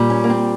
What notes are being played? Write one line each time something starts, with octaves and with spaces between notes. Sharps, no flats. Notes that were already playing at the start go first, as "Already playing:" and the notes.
Already playing: A#2 G3
C#4
A#3
C4